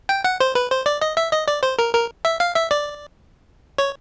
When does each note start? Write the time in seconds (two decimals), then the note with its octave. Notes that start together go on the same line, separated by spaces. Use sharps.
0.09 G5
0.24 F#5
0.40 C5
0.55 B4
0.70 C5
0.86 D5
1.01 D#5
1.17 E5
1.32 D#5
1.48 D5
1.63 C5
1.79 A#4
1.94 A#4
2.25 E5
2.40 F5
2.56 E5
2.71 D5
3.78 C#5